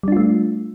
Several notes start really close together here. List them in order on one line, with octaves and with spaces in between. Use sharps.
G3 D4 F4 A3